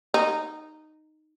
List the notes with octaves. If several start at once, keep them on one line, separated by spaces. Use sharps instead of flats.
D#4